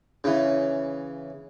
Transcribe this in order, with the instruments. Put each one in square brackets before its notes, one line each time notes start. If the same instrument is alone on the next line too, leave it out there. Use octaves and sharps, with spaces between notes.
[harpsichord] C#3 E3